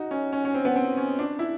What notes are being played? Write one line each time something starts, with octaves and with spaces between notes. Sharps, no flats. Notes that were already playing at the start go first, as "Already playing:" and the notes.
Already playing: D#4 F#4
C#4
C#4
C#4
C4
B3
C4
C#4
D4
E4